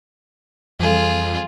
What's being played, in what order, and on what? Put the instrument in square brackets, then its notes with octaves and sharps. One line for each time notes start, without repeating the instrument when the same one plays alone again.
[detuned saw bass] F2 [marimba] E3 G3 A4 [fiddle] F4 G#4